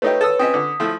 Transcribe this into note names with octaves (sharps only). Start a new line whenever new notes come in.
A3 D#4 G4 B4 C#5
A4 B4 D#6 E6
C4 C#4 D#5 D#6 B6
D3
F3 A3 E4